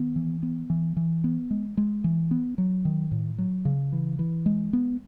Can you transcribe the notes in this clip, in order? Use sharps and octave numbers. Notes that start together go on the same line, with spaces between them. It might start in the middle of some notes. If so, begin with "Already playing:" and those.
Already playing: D#3 B3
E3
B3
E3
E3
B3
G#3
G#3
E3
B3
F#3
D#3
A2
F#3
C#3
E3
E3
G#3
B3